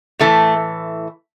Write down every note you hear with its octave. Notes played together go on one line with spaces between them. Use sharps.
A2 E3 A3